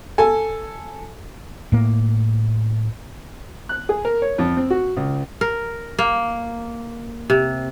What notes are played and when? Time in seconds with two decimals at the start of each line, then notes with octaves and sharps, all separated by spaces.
0.18 A4 G#5
1.72 A2 A#3
3.69 F#6
3.89 G#4
4.05 A#4
4.22 C#5
4.38 F2
4.57 C4
4.70 F#4
4.97 C#2
5.41 A#4
5.99 A#3
7.30 C3